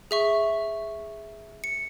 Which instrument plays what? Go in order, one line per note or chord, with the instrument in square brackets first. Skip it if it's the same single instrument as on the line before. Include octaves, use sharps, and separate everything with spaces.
[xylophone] G#4 E5 C#6
C#7